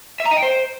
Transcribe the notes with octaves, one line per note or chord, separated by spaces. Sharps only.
E5
A#5
D#5
G5
C5